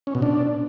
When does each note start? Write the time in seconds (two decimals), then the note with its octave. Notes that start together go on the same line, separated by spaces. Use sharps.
0.07 C#4
0.15 B2
0.22 D4